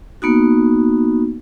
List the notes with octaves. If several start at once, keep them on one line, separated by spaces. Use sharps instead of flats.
A#3 B3 D#4 F#4